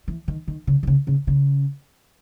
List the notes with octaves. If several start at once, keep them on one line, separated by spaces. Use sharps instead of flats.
E3
D#3
D#3
C#3
D#3
C#3
C#3
C#3